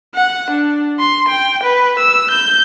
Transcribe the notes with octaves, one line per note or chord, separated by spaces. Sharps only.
F#5
D4
C6
G5
B4
E6
G6